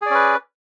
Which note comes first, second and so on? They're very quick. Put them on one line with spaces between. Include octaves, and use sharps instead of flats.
G#4 D5 C#4 B4